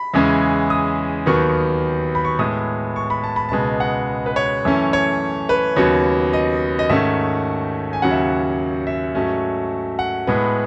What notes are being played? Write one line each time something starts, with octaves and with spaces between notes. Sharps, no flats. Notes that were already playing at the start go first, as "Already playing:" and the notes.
Already playing: B5
E2 C#3 E3 G#3 C#4
D#6
D#2 D#3 F#3 B3 C#6
B5
C#6
A2 G#3 B3 D#6
C#6
B5
A5
B5
C#2 B2 G#3 B3 A5
F#5
B4
C#5
F#2 E3 A3 C#4
C#5
B4
D#2 C#3 F#3 B3 C#5
D#5
D#5
G#2 D#3 A3 C#4 E5
G#5
D#2 C#3 F#3 C#4 F#5
E5
E5
G#2 F#3 A3 C#4
F#5
A2 G#3 B3